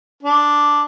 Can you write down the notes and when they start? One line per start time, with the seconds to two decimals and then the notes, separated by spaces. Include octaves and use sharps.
0.23 D4